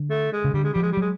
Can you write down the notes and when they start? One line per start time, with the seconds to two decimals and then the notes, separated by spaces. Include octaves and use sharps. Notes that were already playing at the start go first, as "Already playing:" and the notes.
Already playing: D3
0.10 A3
0.32 G#3
0.44 C#3
0.54 D3 G3
0.64 G#3
0.73 F3 G3
0.82 G#3
0.92 G3
0.97 F#3 G#3